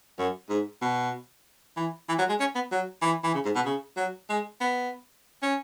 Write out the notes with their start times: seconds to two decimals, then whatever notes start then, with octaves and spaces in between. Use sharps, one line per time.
0.19 F#2
0.50 G#2
0.82 B2
1.77 E3
2.09 E3
2.19 F#3
2.29 G#3
2.40 C#4
2.55 B3
2.72 F#3
3.02 E3
3.24 E3
3.35 C#3
3.45 G#2
3.55 B2
3.66 C#3
3.97 F#3
4.29 G#3
4.61 B3
5.43 C#4